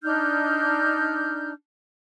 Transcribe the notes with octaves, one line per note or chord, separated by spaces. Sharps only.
D4 D#4 F6 G6